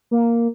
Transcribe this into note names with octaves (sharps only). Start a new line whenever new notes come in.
A#3